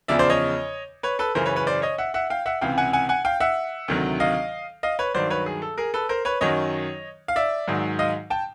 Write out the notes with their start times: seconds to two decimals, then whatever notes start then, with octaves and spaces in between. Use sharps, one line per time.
0.08 E2 C#3 F3 D5 E5
0.19 C5 D5
0.30 C#5 D#5
1.03 B4 C#5
1.19 A4 B4
1.35 F#2 C#3 E3 A#4 C5
1.46 B4 C#5
1.56 B4 C#5
1.67 C5 D5
1.82 C#5 D#5
1.98 E5 F#5
2.14 E5 F#5
2.30 F5 G5
2.46 E5 F#5
2.61 C#2 C3 E3 F5 G5
2.78 F#5 G#5
2.93 F#5 G#5
3.09 F#5 G#5
3.25 F5 G5
3.40 E5 F#5
3.88 D2 C3 D#3 F#3
4.20 D#5 F5
4.83 D#5 F5
4.99 B4 C#5
5.14 G2 D#3 F#3 C5 D5
5.30 B4 C#5
5.46 G#4
5.62 A4
5.78 G#4 A#4
5.94 A4 B4
6.09 A#4 C5
6.25 B4 C#5
6.41 F#2 D#3 F#3 C#5 D#5
7.28 F5
7.36 D5 E5
7.68 G#2 D#3 F#3
7.99 D#5 F5
8.30 G5 A5